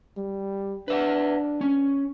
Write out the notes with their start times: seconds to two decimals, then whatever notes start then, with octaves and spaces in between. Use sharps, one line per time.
0.17 G3
0.88 D4 B4 E5 F#5
1.61 C#4